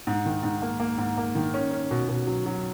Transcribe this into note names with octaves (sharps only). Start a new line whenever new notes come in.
G#2
D#3
G#2
A#3
A#3
G#2
A#3
D#3
C#4
C#4
B2
B2
F#3
F#3